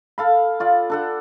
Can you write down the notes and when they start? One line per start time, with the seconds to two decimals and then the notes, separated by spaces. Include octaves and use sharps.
0.18 A4 F5 B5
0.60 F4 D5
0.90 D4 A4 F#5